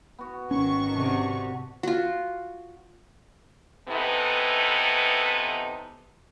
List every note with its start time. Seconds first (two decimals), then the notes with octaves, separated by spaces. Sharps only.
0.19 B3 F#4
0.51 G#1 D#3 C#4 C#6
0.95 C3 D4 F#4
1.83 F4 F#4
3.88 C3 E3 B3 D#4 A4 B4